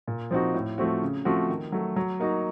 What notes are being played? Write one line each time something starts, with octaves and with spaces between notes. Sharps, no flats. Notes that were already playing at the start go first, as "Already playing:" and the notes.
A#2
F3 C4 D#4 F#4
A2
F3 A3 C4 F#4
C#3
F3 A3 C4 F#4
D#3
F#3 A3
F#3
A#3 D#4 F#4